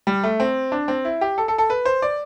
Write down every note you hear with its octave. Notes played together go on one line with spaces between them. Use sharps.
G3
A3
C4
D4
C4
E4
G4
A4
A4
A4
B4
C5
D5